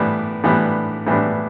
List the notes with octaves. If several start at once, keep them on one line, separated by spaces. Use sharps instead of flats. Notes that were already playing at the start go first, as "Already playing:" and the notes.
Already playing: A2 E3 G3 B3 D4
A2 E3 G3 B3 D4
A2 E3 G3 B3 D4